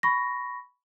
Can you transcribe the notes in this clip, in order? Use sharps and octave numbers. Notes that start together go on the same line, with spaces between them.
B5 C#6 A#6